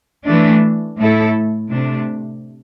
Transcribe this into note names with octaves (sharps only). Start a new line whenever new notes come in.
E3 A3 D4
A2 A3 E4 A4
C3 A3 D4